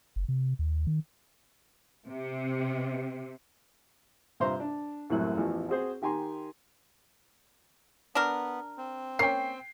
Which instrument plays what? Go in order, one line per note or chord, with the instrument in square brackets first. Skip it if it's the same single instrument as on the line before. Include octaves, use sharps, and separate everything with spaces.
[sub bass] F#1
C3
D#2
D#3
[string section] C3
[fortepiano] G2 C3 F4 C5 A#5 C6
D4
C2 F#2 A2 E3 F#3 F#6
A1 E2 E3 F3
C4 F#4 G#4 C5
D#3 G4 G#5 A#5 C6
[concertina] B3 [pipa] D4 A#4
[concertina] C4
[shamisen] A#3 C#4 C#5 [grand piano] G5 C7